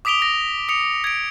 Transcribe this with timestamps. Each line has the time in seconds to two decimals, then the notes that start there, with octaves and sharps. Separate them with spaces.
0.05 D6 D#6 B6 D7 F7 G7
0.22 A#6
0.69 D#6 C#7 F7
1.04 G#6 D7